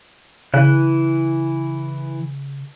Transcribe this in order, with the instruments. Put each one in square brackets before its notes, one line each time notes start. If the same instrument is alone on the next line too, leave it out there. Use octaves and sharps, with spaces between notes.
[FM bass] C#3 [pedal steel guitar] E3 F#6